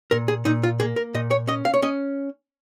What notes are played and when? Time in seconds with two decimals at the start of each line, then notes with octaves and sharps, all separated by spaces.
0.11 A#2 A#4
0.28 G#4
0.45 A#2 D#4
0.63 F4
0.80 A#3 G#4
0.96 A#4
1.14 A#2 D#5
1.31 C#5
1.47 C#4 D#5
1.65 F5
1.74 C#5
1.82 C#4 D#5